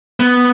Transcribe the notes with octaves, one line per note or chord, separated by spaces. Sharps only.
B3